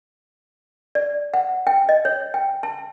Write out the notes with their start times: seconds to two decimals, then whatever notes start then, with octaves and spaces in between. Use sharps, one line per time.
0.95 D5
1.34 F#5
1.67 G5
1.89 D#5
2.05 C#5
2.34 G5
2.63 A5